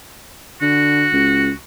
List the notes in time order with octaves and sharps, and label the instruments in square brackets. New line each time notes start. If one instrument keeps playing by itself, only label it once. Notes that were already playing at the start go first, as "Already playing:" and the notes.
[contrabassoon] D3 [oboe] F#4
[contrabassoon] C#2